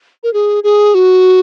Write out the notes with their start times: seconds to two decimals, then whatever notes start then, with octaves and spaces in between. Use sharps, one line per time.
0.23 A#4
0.34 G#4
0.64 G#4
0.95 F#4